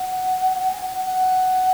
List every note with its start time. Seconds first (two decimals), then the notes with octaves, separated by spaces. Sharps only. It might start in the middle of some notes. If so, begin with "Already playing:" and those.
Already playing: F#5
0.69 G#5
0.80 F#5
0.92 F#5
1.04 F#5